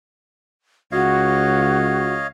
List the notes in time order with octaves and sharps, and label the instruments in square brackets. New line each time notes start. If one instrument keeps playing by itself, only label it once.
[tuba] C#2 [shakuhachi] F#4 [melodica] C#5 D#5 F5